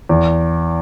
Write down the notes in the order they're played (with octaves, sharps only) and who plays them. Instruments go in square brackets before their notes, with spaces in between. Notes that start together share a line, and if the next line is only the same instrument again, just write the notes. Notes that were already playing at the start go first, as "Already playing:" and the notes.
[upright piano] E2